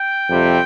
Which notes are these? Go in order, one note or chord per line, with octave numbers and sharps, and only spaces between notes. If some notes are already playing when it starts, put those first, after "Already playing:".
Already playing: G5
F2 C3 G3 C4